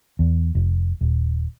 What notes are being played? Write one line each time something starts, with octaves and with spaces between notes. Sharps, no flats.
E2
F1
D#1